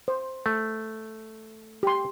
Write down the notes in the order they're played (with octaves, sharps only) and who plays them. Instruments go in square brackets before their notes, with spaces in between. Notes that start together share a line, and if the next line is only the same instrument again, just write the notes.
[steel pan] C5
[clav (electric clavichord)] A3
[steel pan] G4 C6